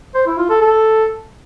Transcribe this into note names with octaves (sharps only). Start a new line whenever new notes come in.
C5
E4
F4
A4
A4